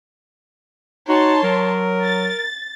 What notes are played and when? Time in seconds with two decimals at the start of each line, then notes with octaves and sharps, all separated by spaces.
1.09 D#4 F#4 C#5 A5 C6
1.43 F#3 A#4
2.03 A6